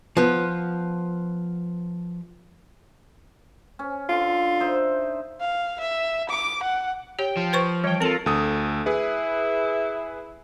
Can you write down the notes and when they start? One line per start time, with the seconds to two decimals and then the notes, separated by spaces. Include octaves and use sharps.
0.17 F3 B3
3.79 C#4
4.09 D3 F4
4.60 D#4 C5 E5
5.40 F5
5.80 E5
6.30 D6
6.63 F#5
7.19 G4 C#5 G5
7.37 F3
7.53 B4 C5 C#6
7.84 E3 G3 C#5 G5
8.00 C4 F4 A4 A#4 A5
8.26 D2 A4 D#6
8.86 E4 G#4 B4